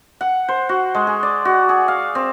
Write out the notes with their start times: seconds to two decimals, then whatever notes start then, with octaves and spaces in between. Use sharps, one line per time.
0.21 F#5
0.49 C5
0.69 F#4
0.95 G#3
1.07 G#4
1.23 D5
1.45 F#4
1.69 G#4
1.88 F5
2.15 C4